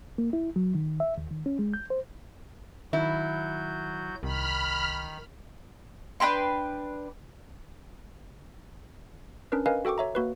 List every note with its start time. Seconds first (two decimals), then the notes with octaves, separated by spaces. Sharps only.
0.18 A#3
0.33 E4
0.56 F#3
0.75 D#3
1.00 E5
1.18 D#2
1.31 D#3
1.46 C#4
1.59 G#3
1.74 G6
1.90 C5
2.93 D#3 F#3 E4 F#4 G6
4.23 C2 D#3 B5 F6
6.20 D4 B4 G5 C6
9.52 C#4 D4 A#4 B4
9.66 A#4 B4 D#5 F5 G#5
9.85 F#4 A4 G5 C#6 D6
9.98 C#5 E5 A#5
10.15 A#3 F#4 B4